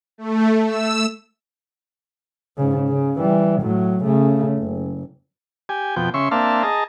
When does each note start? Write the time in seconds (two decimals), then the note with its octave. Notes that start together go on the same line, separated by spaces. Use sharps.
0.18 A3
0.66 E6
2.57 G#2 C#3
2.88 C#3
3.18 E3 G3
3.61 A2 F#3
4.04 C#3 A3
4.57 F#1
5.69 G4 G#5
5.96 F2 B2 G5
6.14 C#3 E5 C6 C#6
6.31 A#3 C4 D4 E5 F5 A5
6.63 G#4 D#5 A5 A#5